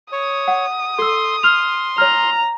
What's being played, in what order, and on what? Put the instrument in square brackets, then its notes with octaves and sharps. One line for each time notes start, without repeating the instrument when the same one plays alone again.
[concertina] C#5 [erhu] D#6
[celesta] F#5
[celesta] A4 E6 [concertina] C6
[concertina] C6 [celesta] F6 F7
[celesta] C#5 F6 [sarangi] A#5